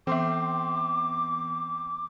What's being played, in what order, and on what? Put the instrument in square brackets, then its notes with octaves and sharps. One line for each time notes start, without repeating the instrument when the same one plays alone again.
[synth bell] E3 B3 [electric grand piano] C4 C6 [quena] D6